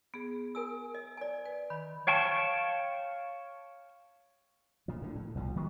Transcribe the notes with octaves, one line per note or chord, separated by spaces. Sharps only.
B3 G#4
A#4 G#5 E6
D#5
D5 G#5
B4
D#3 B5
C#5 F5 G5 A5 C#6
A#2 F3
A2 D3
A2
C2 B2 F3
D#3 F#3 G#3 B3